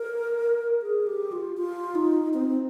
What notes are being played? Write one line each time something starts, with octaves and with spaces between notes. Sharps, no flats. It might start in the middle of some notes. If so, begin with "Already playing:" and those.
Already playing: A#4
G#4
G4
F4
F4
D#4
C4